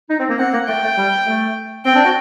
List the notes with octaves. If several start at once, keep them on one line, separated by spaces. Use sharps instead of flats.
D#4
C4
A#3
C4 F#5
A#3
A3 G5
A3
G3
A3
C4 G5
D4
F#4